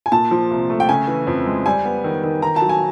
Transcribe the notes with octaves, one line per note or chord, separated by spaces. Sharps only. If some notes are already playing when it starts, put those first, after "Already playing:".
G#5
A#2 A5
F3
C2
A3
G5
C#3 G#5
E3
F2
G#3
G3 G#5
B3
D#3
D#3
D#3 A#5
A5
F#3
G#5